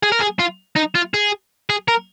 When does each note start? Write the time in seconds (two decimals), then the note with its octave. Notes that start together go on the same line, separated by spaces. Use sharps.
0.03 G#4
0.12 A#4
0.21 G#4
0.40 F4
0.76 D#4
0.95 F4
1.14 G#4
1.70 G#4
1.88 A#4